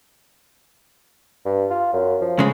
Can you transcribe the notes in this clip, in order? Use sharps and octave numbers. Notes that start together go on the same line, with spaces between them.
G2
F4
F#2
F3
C#3 G#3